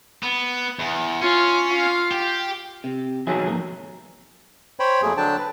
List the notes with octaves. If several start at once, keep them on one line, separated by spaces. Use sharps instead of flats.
B3
E2
C#4 F4
F4 F5
G4
C3
B1 E2 D#3 F#3 G#4 E5
F2 G#2 A#3
C5 C#5 G5 B5
F2 F#3 A3 A#3 G#4
D3 F#3 D4 G5 A5
B4